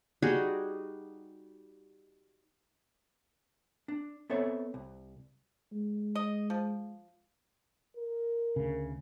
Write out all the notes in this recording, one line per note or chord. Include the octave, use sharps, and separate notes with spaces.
G3 D#4 F#4 G#4
D4
B3 C4 A4 C#5 E5
C2
G#3
D#5
F3
A#4
D2 C#3